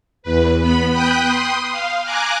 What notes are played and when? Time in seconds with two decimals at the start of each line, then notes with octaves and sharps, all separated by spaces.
0.23 E2 B4
0.61 B3 B5
0.93 G5 B5 D#6 F#6 G6
1.24 C6 D#6
1.71 F5
2.04 G#5 A#5 D6 F#6